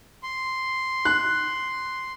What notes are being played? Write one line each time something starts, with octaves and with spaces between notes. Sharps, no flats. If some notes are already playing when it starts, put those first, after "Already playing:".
C6
F#6